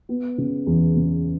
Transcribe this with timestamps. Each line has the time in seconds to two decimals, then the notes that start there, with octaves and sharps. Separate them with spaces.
0.09 B3
0.38 C#3
0.67 E2
0.96 C#3